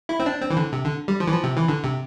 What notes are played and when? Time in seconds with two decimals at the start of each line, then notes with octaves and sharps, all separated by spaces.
0.09 E4
0.20 C4
0.26 D4
0.41 C4
0.50 E3
0.57 D3
0.72 C3
0.84 D3
1.08 G3
1.20 F3
1.27 E3
1.32 F3
1.44 C3
1.57 E3
1.68 D3
1.84 C3